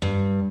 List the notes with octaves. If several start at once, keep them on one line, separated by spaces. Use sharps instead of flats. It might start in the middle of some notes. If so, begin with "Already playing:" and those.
G2